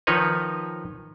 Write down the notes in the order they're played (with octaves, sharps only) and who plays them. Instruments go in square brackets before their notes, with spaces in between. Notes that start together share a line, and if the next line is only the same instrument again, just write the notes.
[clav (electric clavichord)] D#3 F3 D#4 B4 C#5 D#5